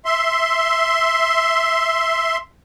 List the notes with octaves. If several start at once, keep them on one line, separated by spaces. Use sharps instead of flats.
E5 C6